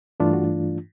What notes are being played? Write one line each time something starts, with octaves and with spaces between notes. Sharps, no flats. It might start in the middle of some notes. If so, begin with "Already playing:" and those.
G2 E3 A3 D4 F4
F#4